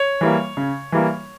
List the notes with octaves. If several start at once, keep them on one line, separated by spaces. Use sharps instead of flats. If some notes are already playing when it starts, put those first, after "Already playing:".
Already playing: C#5
E3 G3 A#3
C#3
E3 G3 A#3